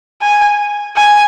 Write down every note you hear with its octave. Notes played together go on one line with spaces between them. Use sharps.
G#5
G#5